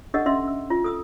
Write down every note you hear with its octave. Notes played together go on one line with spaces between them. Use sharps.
D4 G4 A4 D#5 F#5 E6
C#4 F#4 D#5 E5 C6 E6
E6
F4
A4 D#6 E6